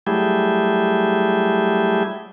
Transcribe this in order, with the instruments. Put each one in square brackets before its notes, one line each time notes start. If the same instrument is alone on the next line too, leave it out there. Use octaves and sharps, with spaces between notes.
[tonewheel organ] F#3 G3 A3 E4 G4 G#4